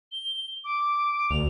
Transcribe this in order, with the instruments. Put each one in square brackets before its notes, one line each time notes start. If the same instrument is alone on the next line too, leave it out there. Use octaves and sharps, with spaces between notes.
[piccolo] G7
D6
[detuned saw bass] D2 [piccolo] F7